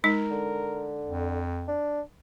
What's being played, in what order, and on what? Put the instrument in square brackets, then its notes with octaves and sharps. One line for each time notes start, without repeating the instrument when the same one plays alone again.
[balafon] G#3 D#4 [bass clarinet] A#4
[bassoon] D3
[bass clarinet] F2
[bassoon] D4